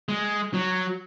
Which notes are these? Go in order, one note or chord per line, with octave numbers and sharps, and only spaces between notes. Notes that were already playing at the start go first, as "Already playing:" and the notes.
G#3
F#3